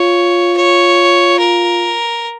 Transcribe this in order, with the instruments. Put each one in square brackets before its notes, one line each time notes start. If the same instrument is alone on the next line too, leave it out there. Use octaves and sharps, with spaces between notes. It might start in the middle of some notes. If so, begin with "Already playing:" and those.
Already playing: [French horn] F4 [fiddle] C#5
[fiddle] C#5
A#4